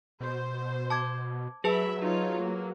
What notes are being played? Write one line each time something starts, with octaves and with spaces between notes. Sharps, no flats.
B2 C5
A5 D6 G#6
F#3 G#4 B4 E5 A5 B5
D#4 F4 C#5
A#3